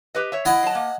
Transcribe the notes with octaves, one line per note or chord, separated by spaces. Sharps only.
G4 B4 D#5
C#5 E5
E4 D#5 F#5 G#5
F#3 A5
A#3